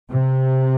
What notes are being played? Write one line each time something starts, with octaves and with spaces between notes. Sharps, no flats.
C3